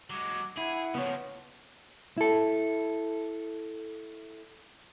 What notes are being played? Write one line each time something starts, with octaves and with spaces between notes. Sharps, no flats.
F#3 G#3 D6
E4 G#4 F#5
C#3 F3 B3 C#5
E4 A4